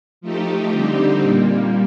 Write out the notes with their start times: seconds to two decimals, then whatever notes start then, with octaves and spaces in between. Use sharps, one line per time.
0.21 F3 A3 D#4 G4
0.71 D3 G3 C4 D#4 G4
1.20 A#2 G3 A#3